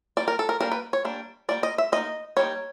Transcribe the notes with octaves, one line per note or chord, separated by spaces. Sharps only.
G3 A#3 D4 D5
A#4
A4
A#4
G3 A#3 D4 A#4
B4
C#5
G3 A#3 D4
G3 A#3 D4 D5
D#5
E5
G3 A#3 D#4 D#5
G3 A#3 D#4 C#5